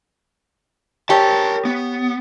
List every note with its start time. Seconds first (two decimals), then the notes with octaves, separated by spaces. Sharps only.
1.10 G4 A#4 C#5 A5
1.65 B3